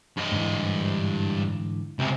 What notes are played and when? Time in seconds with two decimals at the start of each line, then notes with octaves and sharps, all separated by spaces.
0.17 G2 D#5
0.32 G#2 D3 E3
1.99 C#2 C3